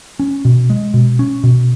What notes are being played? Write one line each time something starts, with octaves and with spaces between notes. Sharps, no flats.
C#4
B2
G#3
B2
C#4
B2